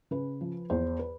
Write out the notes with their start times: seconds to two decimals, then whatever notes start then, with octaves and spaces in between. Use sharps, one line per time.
0.11 C#3 B4
0.41 F3
0.70 E2 C5
0.99 B4